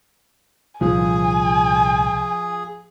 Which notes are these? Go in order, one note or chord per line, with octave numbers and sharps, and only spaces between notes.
C2 A#2 D3 F3 G#4 G#5